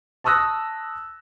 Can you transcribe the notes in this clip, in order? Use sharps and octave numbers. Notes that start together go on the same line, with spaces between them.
A5 C#6 D#6 E6 F#6 A#6